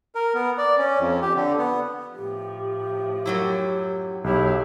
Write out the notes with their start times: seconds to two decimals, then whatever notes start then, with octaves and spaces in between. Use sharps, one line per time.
0.15 A#4
0.35 B3
0.58 D5
0.79 C#4
0.99 F2
1.22 G4
1.36 D3
1.58 B3
2.15 A2 F3 G4
3.26 F#2 F#3 E4
4.24 B1 E4 G4 G#4 C#5 F5